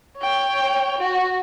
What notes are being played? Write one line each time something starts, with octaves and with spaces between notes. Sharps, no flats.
C#5 G5
F#4